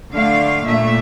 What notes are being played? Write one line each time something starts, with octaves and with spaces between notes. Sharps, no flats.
D3 A3 F5
A#2 A3 E5